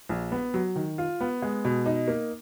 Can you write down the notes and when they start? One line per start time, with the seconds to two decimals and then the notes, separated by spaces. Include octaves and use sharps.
0.09 A#1
0.32 B3
0.54 F#3
0.76 D#3
0.98 F4
1.20 B3
1.42 G#3
1.65 B2
1.86 D#4
2.08 A#3